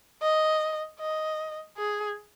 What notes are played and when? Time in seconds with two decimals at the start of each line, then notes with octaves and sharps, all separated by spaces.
0.22 D#5
1.00 D#5
1.77 G#4